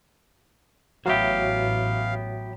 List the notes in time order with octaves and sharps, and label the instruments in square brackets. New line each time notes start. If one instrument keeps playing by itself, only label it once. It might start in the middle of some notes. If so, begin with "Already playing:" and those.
[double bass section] A1 [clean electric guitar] F#3 B3 G4 [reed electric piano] F#4 C#5 E5 [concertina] F5